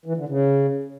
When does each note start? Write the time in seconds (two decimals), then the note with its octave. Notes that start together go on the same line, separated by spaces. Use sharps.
0.06 E3
0.17 D3
0.29 C#3